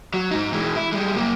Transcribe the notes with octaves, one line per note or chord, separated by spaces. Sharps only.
F#3
G#2 D#4
E3 G#3
E4
G3 G#3
F#2 A#3